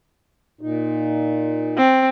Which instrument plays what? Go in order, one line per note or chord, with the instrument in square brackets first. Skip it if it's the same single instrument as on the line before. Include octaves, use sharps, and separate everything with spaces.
[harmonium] A#2 D#4
[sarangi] C4